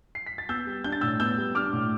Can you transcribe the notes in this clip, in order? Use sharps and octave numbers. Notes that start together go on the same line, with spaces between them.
C7
B6
A6
B3 E6 G6
G3
D4 G6
A6
A2 E6 G6
B3 E6 G6
G3
D4 D6 F6
A2